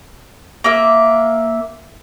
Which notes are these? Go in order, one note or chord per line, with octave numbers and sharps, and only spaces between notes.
A#3 E5